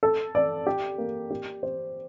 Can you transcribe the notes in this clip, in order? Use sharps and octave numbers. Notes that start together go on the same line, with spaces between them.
A4
D5
G4
A#3
G4
C5